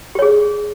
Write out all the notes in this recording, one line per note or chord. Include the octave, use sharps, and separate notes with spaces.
G4 G#4 C#5